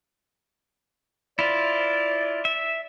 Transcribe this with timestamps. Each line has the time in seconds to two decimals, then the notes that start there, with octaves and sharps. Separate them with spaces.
1.39 E4 F4 D5
2.45 E5